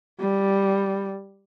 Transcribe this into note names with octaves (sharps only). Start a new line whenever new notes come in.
G3